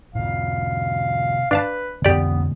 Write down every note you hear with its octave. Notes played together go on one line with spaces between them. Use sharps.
A2 C3 F5
D4 B4 F5 A5
F2 A2 D3 B3 G4 D5